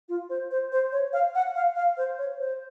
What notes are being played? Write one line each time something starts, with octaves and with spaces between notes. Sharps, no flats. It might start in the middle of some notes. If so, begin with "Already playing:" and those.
F4
C5
C5
C5
C#5
F5
F#5
F5
F5
C5
C#5
C5